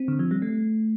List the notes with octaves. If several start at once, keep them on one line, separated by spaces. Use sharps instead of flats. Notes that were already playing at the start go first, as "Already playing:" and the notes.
Already playing: C4
D3
F3
G3
A3